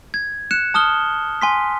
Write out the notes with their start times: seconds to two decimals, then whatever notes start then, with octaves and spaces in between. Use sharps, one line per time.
0.14 G#6
0.51 F#6 C#7 E7
0.74 A5 D#6 F6 G7
1.41 G#5 C6 B6